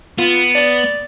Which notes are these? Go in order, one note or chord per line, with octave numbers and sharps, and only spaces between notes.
B3 F4
D5